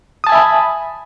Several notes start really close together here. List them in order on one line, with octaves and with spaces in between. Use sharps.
D#6 A5 G#5 E5 B5